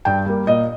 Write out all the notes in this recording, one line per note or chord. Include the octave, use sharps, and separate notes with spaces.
G2 G5
G3 A#3
A#2 D#5